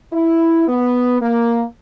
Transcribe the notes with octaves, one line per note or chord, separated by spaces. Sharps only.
E4
B3
A#3